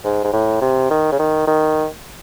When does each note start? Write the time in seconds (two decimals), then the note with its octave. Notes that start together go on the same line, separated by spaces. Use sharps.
0.05 G#2
0.24 G#2
0.33 A2
0.61 C3
0.90 D#3
1.12 C#3
1.19 D#3
1.47 D#3